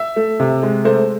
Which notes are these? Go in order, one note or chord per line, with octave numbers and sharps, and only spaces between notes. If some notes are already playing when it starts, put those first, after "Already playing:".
Already playing: E5
A3
C3
G#3
A3 C5